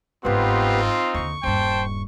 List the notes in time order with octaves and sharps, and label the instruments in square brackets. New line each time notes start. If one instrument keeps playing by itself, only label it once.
[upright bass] G1 G#2 [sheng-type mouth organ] B3 G4 B4 [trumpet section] C4 D#4 F4
[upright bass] D#2 D3 [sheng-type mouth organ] C#6
[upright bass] D#1 G2 [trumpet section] C5 G5 A5